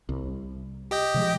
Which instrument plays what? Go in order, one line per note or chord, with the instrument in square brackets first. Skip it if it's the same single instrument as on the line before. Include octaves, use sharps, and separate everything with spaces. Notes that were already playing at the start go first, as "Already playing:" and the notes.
[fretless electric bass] C2
[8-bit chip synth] G4 D#5 G5
[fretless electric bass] C3 F3 G#3